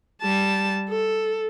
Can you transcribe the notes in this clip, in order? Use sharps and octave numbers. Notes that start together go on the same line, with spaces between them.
G3 A5
A4